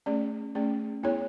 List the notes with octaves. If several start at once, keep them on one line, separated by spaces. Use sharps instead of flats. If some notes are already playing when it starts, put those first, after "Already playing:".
A3 C#4 G#4 D5
A3 C#4 G#4 D5
B3 E4 G#4 C#5